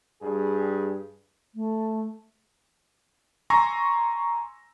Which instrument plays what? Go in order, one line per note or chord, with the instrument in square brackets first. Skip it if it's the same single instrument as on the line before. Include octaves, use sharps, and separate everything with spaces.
[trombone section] G2 G#4
[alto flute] A3
[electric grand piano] G#5 A#5 C6 C#6 E6 A#6